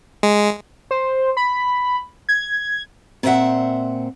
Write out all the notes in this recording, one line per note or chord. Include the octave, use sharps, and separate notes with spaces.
G#3
C5
B5
G#6
A#2 C4 C5 C#5 E5 F#5